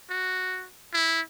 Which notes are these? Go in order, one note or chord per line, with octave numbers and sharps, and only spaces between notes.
F#4
E4